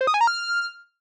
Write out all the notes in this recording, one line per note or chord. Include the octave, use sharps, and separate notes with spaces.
C5
D#6
G#5
A#5
F6